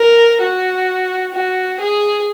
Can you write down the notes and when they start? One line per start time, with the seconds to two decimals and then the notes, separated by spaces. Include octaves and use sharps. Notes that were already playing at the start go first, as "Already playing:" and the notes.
Already playing: A#4
0.41 F#4
1.34 F#4
1.80 G#4